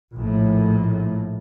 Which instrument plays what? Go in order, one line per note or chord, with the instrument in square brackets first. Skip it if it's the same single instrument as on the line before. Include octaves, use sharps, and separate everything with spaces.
[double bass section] A#1 A2